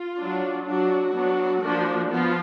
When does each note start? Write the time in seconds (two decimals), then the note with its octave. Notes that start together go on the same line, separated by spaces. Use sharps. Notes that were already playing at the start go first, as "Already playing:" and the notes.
Already playing: F4
0.18 F#3 D4
0.66 F#3 D4 F#4
1.14 F#3 B3 D4
1.62 F3 A#3 D4
2.10 F3 B3 F4